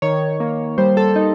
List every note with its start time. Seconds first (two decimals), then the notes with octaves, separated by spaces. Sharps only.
0.02 D#3 C#5
0.40 A#3
0.78 G3 C5
0.97 A4
1.16 D#4